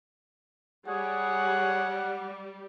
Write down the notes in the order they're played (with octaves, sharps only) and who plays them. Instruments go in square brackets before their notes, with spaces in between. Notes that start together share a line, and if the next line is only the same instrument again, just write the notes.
[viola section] G3 [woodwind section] G#4 C#5 [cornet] F#5